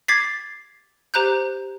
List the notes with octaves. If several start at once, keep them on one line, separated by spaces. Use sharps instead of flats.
D6 G#6 A6 B6 C7
G4 C5 A#5 F#6 G6